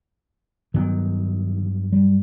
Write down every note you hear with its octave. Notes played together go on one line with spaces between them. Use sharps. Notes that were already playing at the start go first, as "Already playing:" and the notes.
G2 D#3 F#3 B3
G3